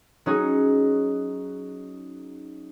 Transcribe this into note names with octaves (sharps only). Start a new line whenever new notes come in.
F#3 C#4 D#4 F#4 G#4